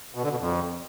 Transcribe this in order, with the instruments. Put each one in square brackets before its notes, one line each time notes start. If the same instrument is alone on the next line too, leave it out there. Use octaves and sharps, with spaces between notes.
[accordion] B2
D3
B2
F2